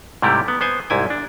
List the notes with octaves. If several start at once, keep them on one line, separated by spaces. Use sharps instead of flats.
G#2 C3 G3 A3 E4 G4
B3
B3 C5 G#5
C2 G#2 E4 G#5
D4